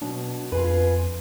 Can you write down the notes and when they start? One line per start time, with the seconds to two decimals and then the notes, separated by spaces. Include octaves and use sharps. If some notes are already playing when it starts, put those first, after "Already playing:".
0.01 B2 F#3 D4
0.52 F2 F4 G#4 B4